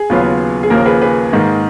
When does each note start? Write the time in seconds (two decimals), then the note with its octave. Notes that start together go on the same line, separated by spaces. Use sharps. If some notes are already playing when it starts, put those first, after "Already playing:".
Already playing: G#4
0.10 D#2 C#3 F#3 B3 F4
0.63 G#4
0.70 D#2 C#3 F3 A#3 A#4
0.86 G#4 B4
1.01 G#4 B4
1.33 G#2 D#3 A#3